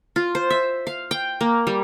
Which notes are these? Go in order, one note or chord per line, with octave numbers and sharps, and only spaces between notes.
F4
C5
E5
F5
G5
A#3
G3